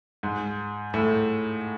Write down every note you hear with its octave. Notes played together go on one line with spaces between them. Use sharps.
G#2
A2